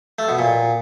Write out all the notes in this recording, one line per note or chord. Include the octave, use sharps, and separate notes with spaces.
A3
B2
A#2